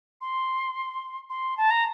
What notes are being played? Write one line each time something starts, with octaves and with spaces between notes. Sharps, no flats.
C6
C6
A5
A#5